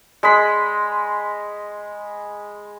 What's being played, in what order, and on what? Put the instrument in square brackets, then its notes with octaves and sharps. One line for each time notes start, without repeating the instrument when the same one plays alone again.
[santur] G#3 B5